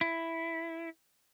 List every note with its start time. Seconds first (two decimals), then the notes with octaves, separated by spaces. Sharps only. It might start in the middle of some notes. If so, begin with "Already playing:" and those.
0.01 E4